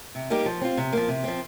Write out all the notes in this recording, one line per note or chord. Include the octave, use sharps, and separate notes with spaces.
C3
G3 A#3 D#4 G4
F3
C4 F4
C3
F3 A#3
C3
F3 C4